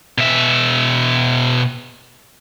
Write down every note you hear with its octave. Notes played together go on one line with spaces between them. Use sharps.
B2 E5